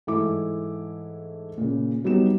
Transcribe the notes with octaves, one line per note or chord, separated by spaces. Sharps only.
G#2 E3 A3 E4 D6
A#2 C#3
F#3 G3 B3 D#4 E7